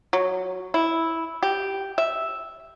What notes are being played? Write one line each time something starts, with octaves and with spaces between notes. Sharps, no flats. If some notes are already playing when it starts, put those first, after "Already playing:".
F#3
E4
G4
E5